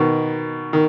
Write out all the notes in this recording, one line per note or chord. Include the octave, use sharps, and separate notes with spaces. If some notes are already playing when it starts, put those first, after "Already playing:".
Already playing: B2 D#3
D#3